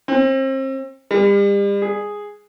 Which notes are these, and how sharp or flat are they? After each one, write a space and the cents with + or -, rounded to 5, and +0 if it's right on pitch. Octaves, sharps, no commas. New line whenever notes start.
C4 +35
G3 +40
G#4 -5